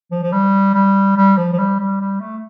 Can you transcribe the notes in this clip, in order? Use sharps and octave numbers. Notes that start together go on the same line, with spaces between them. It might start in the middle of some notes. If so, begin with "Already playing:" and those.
F3
F3
G3
G3
G3
F3
F3
G3
G3
G3
A3